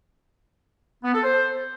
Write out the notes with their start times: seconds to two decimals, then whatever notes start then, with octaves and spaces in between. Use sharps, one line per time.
1.04 B3
1.14 A4
1.23 C5